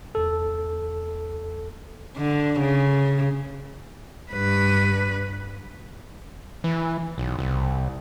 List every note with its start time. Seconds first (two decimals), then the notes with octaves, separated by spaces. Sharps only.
0.15 E2 A4
2.17 D3
2.60 C#3
4.32 G2 B4
6.64 E3
7.18 B1
7.39 C2